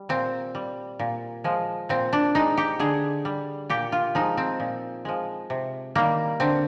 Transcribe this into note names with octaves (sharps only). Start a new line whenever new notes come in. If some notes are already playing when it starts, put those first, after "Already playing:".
Already playing: G3
A#2 C4
G3
A#2
F3 G#3
A#2 C4
D4
G#3 D#4
G4
D3 G#4
G3
A#2 G4
F4
F3 G#3 D#4
C4
A#2
F3 G#3
C3
D#3 G3 A#3
D3 C4